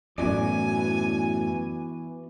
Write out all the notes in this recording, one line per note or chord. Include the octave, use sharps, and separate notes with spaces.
F#2 A2 E3 B3 F#4 D5 G#5